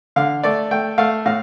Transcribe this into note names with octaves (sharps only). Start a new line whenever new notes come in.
D3 F5
A3 D5
A3 G5
A3 F5
A2 F5